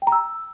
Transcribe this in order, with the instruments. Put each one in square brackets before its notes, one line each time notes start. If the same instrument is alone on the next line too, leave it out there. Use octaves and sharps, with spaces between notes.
[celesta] G5
A#5
E6